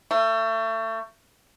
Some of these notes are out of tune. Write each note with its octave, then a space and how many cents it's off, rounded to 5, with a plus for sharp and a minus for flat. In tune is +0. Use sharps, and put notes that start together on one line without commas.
A3 +30